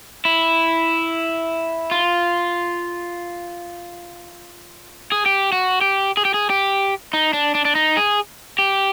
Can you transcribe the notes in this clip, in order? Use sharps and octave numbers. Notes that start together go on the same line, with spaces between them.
E4
F4
G#4
G4
F#4
G4
G#4
G4
G#4
G4
D#4
D4
D4
D4
D#4
G#4
G4